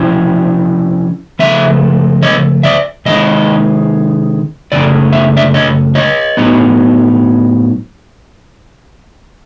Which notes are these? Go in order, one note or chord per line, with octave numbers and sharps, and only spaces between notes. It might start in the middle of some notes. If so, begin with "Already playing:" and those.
Already playing: C3 F3 C#4 E4
C#3 F3 A3 E5
C#5 D#5
D5 E5
C3 D#3 G#3 D#4 D#5
F#2 C#3 A3 C#4 D5
E5
D5 E5
C#5 D#5
C#5 D#5
A2 F#3 B3 D#4